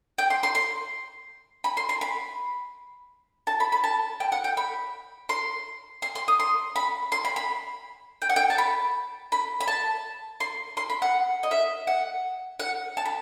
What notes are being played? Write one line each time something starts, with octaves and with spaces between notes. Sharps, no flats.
G5
C6
C6
C6
B5
C6
C6
B5
A5
B5
B5
A5
G5
F#5
G5
B5
C6
C6
C6
D#6
C6
B5
C6
B5
B5
G5
F#5
G5
A5
B5
B5
B5
A5
C6
C6
B5
F#5
D#5
E5
F#5
F#5
A5
B5